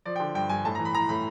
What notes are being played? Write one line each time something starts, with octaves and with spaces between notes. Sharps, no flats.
F3 D5
G5
D3
G2 G5
G2 G#5
A2 A5
A#5
E3
B5
E3 A#5
A2 B5